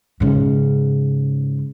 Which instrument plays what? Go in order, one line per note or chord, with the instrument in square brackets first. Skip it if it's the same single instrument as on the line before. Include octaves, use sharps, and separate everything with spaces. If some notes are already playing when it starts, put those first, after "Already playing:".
[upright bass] G#2 C#3